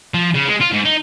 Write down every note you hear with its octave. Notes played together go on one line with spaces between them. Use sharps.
F3
C#3
G#3
F4
G#2
D#4